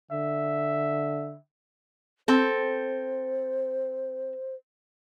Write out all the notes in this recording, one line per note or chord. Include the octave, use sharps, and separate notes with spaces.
D3 E5
C4 A4 C5